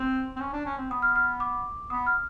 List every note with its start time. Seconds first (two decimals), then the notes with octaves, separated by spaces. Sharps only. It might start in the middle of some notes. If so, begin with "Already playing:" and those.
Already playing: C4
0.36 C4
0.40 C#4
0.53 D4
0.66 C#4
0.78 C4
0.90 B3 D#6
1.02 F6
1.16 F6
1.40 D6
1.90 B3 D#6
2.06 F6